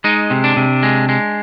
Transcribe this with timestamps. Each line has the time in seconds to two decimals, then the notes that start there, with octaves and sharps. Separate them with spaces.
0.04 G#3 D#4
0.30 C3
0.44 D4
0.57 C3
0.83 G#3
1.09 G#3